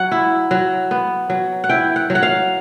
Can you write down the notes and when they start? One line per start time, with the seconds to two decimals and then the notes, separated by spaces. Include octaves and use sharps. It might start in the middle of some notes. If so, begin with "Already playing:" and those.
Already playing: F#3 F#5
0.12 E4
0.51 F#3
0.91 B3
1.30 F#3
1.64 F#5
1.69 E4 G5
1.96 F#5
2.10 F#3
2.15 F#5
2.23 F5